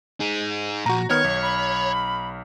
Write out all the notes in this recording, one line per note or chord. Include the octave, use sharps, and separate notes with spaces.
D#4 G#4
A#2 F3 F#4 A#5
D#3 B3 C#5 F6 G#6
B1
B5